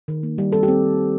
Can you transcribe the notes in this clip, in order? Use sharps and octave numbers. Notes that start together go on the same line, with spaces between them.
D#3
A#3
G3
C4 A4
G4
C4